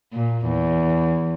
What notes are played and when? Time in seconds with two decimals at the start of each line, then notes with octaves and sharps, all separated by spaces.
0.13 A#2
0.46 E2